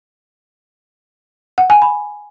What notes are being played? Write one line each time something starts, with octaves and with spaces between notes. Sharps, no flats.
F#5
G#5
B5